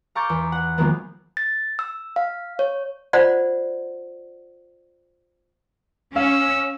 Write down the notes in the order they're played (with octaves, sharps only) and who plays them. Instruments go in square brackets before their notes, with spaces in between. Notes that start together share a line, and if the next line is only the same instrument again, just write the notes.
[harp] F5 A#5 C#6 D6 G6 A6
E2
F#5
D#3 F3 F#3 G#3 A#3 B3
[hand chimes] A6
E6
F5
C#5
[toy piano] F4 C5 D5 F#5
[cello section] C#4 [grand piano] F5 [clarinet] E6